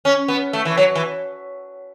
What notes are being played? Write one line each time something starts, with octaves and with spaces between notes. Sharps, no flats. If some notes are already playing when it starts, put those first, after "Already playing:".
C#4
B3
A3
E3
F#3
E3